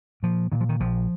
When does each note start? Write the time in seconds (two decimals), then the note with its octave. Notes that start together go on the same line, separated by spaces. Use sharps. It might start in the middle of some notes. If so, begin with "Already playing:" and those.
0.23 A#2 F3
0.52 A#2 D#3
0.60 F3
0.69 D#3
0.80 A#1 F3